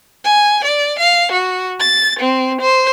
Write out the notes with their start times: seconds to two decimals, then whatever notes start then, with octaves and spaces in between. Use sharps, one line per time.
0.25 G#5
0.64 D5
0.99 F5
1.32 F#4
1.80 A6
2.19 C4
2.61 C5